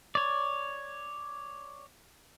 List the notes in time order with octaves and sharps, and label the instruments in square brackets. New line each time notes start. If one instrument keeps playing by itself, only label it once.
[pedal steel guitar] C#5 D5